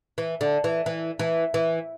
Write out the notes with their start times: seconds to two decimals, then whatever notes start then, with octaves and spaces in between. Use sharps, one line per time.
0.18 E3
0.41 D3
0.64 E3
0.86 E3
1.19 E3
1.54 E3